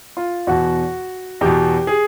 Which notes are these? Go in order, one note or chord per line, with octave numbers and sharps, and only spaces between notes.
F4
E2 B2 F#4
E2 B2 G4
G#4